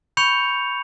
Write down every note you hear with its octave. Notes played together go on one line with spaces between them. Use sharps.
B5 C#6 G6 C#7 F7